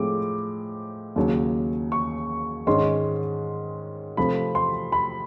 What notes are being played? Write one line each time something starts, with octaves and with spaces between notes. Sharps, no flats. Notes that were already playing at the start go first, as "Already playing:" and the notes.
Already playing: A2 F3 G#3 C4 D6
D#2 C#3 F#3
C#6
G#2 D#3 G#3 C#4 C6
C3 F3 A3 B5
C6
B5